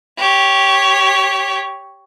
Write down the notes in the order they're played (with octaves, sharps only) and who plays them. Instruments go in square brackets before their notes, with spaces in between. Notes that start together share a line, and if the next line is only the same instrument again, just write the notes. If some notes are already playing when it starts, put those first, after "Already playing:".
[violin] G4 C#5